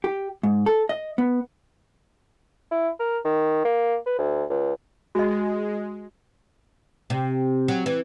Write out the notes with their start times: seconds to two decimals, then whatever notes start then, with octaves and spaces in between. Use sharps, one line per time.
0.04 G4
0.43 G#2
0.66 A4
0.89 D#5
1.18 B3
2.71 E4
3.00 A#4
3.25 D#3
3.65 A#3
4.06 B4
4.18 D2
4.50 C#2
5.15 G#3 F#4 D#5
7.10 C3
7.68 F#3
7.86 E3